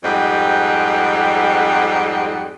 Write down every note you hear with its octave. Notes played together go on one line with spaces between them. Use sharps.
F2 G#2 G3 C4 D#5 F#5